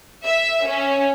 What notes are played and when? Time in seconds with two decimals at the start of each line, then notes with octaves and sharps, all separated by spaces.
0.24 E5
0.64 C#4